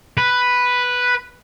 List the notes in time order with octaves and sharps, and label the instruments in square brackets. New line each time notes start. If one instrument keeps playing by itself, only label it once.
[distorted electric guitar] B4